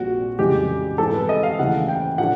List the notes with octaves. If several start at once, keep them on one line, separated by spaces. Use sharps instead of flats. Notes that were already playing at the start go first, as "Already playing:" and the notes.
Already playing: A#1 A#2 G3 C4 F#4
F2 C#3 E3 G#3 G4
G#2 E3 G#3 C4 D#4 A4
B4
D#5
F5
D#2 C#3 E3 A3 F#5
G5
A2 F3 A3 D4 F#5